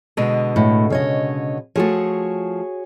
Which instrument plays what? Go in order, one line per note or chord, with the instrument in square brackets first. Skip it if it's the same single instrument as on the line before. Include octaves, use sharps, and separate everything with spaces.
[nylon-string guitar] B2 D3 G#3
[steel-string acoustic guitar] A2
C#3 C#5 D#5
[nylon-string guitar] F3 A3 [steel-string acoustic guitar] F#4 G#4 C#5